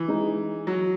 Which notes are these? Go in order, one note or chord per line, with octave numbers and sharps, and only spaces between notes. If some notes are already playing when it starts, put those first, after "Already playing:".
Already playing: E3
G#3 D#4 G#4
F#3